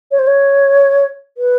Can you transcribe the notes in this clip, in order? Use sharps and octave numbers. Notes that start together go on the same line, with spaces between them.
C#5
C5
C#5
B4